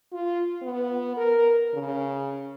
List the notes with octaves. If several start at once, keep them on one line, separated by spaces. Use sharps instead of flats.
F4
B3
A#4
C#3